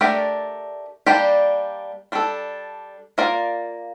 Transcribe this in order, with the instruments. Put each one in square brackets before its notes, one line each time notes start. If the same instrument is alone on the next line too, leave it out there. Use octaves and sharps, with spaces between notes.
[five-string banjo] A3 D4 G4 A#4 D5
G3 A#3 D4 G4 D5
G3 D4 A4
A#3 F4 A#4 D5